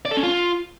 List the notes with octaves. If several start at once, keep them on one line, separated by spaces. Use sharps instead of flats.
D5
A4
C#4
F4